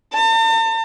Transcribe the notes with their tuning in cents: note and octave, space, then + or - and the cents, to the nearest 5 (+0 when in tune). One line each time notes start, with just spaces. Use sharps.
A5 +45